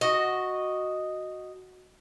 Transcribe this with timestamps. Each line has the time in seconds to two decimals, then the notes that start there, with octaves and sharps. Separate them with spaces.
0.01 F#4 D#5